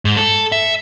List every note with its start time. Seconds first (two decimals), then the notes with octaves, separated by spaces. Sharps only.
0.05 G#2
0.17 A4
0.52 E5